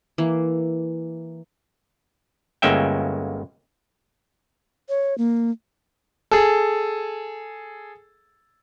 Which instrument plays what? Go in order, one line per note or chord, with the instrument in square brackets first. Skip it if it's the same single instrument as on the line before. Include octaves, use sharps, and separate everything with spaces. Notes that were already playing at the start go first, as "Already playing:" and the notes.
[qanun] E3 A#3
[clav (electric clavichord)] G1 G#3 A#3 C#4 E5 G5
[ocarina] C#5
A#3
[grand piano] G#4 A4